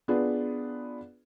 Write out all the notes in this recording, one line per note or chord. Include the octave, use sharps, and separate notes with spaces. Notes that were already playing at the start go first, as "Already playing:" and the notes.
B3 D4 F4 G#4